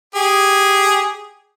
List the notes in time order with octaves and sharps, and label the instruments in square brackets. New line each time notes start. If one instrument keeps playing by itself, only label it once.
[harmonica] G4 G#4